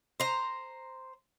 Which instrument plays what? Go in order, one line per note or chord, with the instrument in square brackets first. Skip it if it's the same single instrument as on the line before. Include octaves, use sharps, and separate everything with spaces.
[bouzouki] C5 A#5